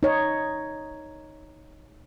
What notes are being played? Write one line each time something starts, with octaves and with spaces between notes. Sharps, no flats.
D#4 C#5